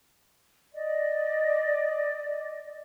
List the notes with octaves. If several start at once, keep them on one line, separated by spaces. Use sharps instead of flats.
D5 D#5